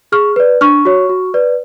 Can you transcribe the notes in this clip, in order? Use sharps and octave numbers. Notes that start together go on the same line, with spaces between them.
G#4 C#6 F6
B4 D5
D4 C#6 F6
F#4 C#5
F#4
B4 D5